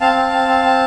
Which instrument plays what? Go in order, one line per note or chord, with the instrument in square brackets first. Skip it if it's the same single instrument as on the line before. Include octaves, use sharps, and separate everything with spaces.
[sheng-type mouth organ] C4 F5 A5
C4
C4
C4
C4